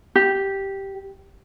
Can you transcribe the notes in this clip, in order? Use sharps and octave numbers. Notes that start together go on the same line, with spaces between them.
G4